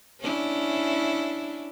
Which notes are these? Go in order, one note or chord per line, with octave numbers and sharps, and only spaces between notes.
C#4 D4 E4